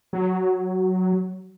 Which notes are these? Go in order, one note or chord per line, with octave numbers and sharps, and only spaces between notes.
F#3